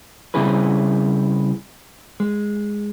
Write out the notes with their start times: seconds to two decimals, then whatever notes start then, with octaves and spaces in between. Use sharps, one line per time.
0.34 C#3 G3 C4 E4 G#4 B4
2.20 G#3